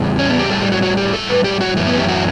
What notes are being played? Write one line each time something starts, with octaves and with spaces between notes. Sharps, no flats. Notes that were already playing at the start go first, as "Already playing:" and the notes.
Already playing: E2 C#3 G3
C#4
B3
G4
A2 G3 A4
G4
F#4
F#4
G4
A4
B4
G4
F#4
F#2 E3 A3
B3
G4
F#4